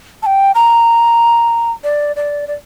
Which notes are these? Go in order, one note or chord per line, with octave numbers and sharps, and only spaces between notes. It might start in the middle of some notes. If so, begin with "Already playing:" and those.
A5
G5
A#5
D5
D5
D5